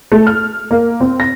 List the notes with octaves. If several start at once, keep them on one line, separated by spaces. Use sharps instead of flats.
A3
F6
A#3
C4
A#6